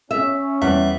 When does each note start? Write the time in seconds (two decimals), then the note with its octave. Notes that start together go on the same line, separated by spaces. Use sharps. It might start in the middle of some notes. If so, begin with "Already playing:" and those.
0.11 C#4 E5
0.62 E2 G3 E5